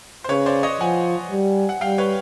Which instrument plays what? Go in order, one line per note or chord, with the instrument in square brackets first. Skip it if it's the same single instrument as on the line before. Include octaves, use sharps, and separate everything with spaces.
[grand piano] C5
[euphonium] C#3 [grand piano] B4 C#5
[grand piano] C5 D5
C#5 D#5
[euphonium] F3 [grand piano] F#5 G#5
[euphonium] G3
[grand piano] F#5
[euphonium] G3 [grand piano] F5 G5
[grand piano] B4 C#5